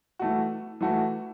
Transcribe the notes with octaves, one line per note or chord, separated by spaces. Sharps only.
E3 A3 F#4
E3 A3 F#4